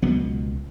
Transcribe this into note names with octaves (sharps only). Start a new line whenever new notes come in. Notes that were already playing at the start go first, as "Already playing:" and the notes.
C#2 B2 F#3 B3